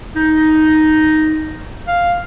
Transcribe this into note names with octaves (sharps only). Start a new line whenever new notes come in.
D#4
F5